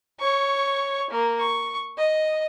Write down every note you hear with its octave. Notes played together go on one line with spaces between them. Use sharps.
C#5 C#6
A#3
C#6
D#5